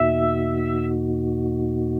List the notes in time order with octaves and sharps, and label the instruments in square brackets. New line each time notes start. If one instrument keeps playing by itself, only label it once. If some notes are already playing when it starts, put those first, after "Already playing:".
Already playing: [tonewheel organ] E2 B2 A#3 D#4 F#4 [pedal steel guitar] E5